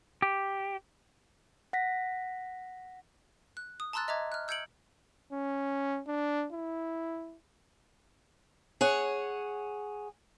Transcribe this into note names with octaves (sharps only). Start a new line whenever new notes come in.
G4
F#5 A#6 B6
F#6
D#6
A5 A#5 C6 E6 F#6 A6
D#5 E5 A#5 D6 G#6
F6 F#6
E6 G6 G#6 C#7 D7 F#7
C#4
D4
E4
G#4 C#5 F#5